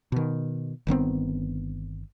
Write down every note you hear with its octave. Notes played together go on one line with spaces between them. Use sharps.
B2 D#3
G1 D#3 B3 C4